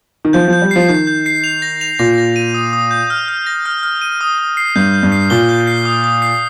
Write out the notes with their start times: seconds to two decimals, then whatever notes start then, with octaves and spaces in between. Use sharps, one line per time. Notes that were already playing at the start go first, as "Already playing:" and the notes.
0.25 D#3
0.33 F3 G6
0.48 F3 G6
0.62 G3
0.71 F3 C7
0.89 D#3 G6
1.07 G6
1.26 C7
1.44 F7
1.62 A#6
1.81 F7
1.99 A#2 A#6
2.18 A#6
2.36 D#7
2.55 D#6
2.73 D#6
2.91 G6
3.10 F6
3.28 F6
3.46 A#6
3.66 F6
3.83 F6
4.01 D#7
4.21 D#6
4.38 D#6
4.57 C7
4.76 G2 G6
4.94 G6
5.03 G2
5.12 C7
5.30 A#2 G7
5.49 G6
5.67 C7
5.85 D#6
6.04 D#6
6.22 C7